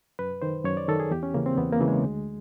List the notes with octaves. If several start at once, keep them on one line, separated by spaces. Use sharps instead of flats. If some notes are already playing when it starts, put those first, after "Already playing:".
F#2 B4
D#3 C5
F#2 C#5
D5
D#3 A4
G#4
E2 G4
C#4
C#3 E3 A#3
C4
E2 B3
A#3
C#3 E3
G#3
D2